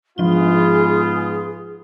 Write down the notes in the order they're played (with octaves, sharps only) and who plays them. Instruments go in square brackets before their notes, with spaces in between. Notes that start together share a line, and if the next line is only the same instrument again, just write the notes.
[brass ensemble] G#2 B3 F4 [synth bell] F3 G7 [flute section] G#4